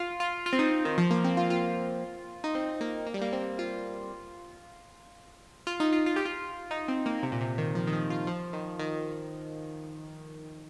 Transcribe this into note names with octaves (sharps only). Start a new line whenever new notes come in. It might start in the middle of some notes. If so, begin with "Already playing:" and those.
Already playing: F4
F4
F4
C4
D#4
D#3
F3
A#3
C4
F4
F4
D#4
C4
A#3
A#3
G3
A#3
C4
F4
F4
D#4
F4
F4
G4
F4
D#4
C4
A#3
C3
A#2
C3
D#3
F3
D#3
F3
F4
F3
D#3
D#3